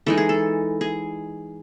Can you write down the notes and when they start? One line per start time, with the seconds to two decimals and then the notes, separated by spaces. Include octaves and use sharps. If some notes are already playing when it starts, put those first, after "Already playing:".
0.06 E3 G#3 D#4 A4
0.17 G#4
0.29 A4
0.81 G#4